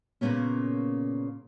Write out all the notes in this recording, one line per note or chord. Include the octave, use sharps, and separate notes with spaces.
A#2 C#3 E3 A#3 B3 C#4